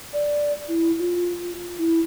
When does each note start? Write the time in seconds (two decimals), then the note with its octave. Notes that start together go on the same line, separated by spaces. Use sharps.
0.13 D5
0.68 E4
0.99 F4
1.78 E4